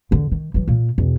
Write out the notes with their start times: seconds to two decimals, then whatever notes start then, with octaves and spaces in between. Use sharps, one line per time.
0.11 E2 D3
0.32 D#3
0.54 E3 F#3
0.68 A#2 A#3
0.98 E2 B2